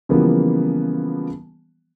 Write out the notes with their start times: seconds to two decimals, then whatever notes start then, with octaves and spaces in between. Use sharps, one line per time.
0.09 C#3 E3 F3 G3 A#3 B3